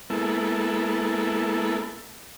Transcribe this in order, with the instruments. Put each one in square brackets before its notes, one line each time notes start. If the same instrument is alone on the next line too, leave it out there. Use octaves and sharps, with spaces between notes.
[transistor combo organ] G#3 A#3 B3 E4 A4